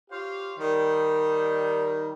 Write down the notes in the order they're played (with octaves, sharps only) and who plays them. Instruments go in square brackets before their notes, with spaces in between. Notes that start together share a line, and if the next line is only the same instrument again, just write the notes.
[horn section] F4 G4 C5 C#5 F5 C6
D#3 G3